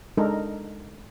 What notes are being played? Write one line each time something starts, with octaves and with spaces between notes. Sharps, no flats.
G#3 D4 D#4 A4 A#4